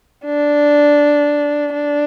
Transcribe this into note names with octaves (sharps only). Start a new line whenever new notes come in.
D4
D4